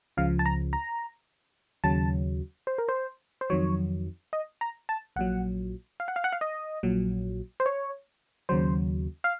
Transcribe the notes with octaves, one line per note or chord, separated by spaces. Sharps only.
C#2 C#3 F3 F5
A5
A#5
A#5
D#2 C#3 F#3 A5
C5
A#4
C5
C5
F2 D#3 F#3 C#5
D#5
A#5
A5
A#1 A#2 F#3 F#5
F5
F#5
F5
F#5
F5
D#5
A#1 A#2 F#3
C5
C#5
D#2 C#3 F#3 C5
F5